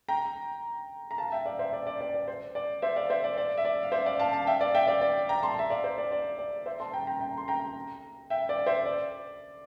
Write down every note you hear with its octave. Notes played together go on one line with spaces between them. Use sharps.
G5 A#5
A#5
F5 A5
E5 G5
D5 F5
C5 E5
D5
D5
D5
D5
C5
D5
C5 E5
D5 F5
C5 E5
D5
D5
E5
D5
F5
C5 E5
D5 F5
F5 A5
F5 A5
E5 G5
D5 F5
E5 G5
D5 F5
D5
G5 A#5
A5 C6
E5
D5 F5
C5
D5
D5
D5
C5 E5
A5 C6
G5 A#5
G5 A#5
G5 A#5
C6
G5 A#5
E5 G5
D5 F5
C5 E5
D5